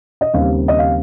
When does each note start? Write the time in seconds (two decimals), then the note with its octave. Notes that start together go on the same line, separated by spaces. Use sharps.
0.21 D#5
0.33 D#2 C#3 G3 C4 F5
0.68 D#5
0.79 F5